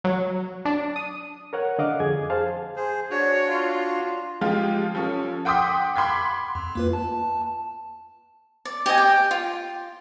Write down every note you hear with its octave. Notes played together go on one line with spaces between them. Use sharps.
F#3
D4
D#6
A#4 C#5 F#5
D3 D#5 F5 F#5 D6
F2 G#4 G#6
G#4 C5 F5 A5
G#4 C5
D4 F#4 C#5
F4
F3 G#3 F4 G4
F3 C#4 A4
F#5 G5 C6 D6 D#6 B6
B5 C6 D6 G#6 B6
F2
A#3 F4 B4
A5
D5
G4 D5 D#5 G#5
G5
F4 G5